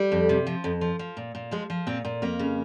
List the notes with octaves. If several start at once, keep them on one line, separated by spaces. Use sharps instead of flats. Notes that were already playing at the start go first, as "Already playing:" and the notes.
Already playing: G3
F2
C3
F3
F2
F3
F3
A#2
A#2
F3 G#3
F3
A#2 C4
A#2
F2 A#3
C#3